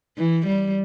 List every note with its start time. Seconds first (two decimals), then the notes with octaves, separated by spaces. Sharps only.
0.18 E3
0.46 G3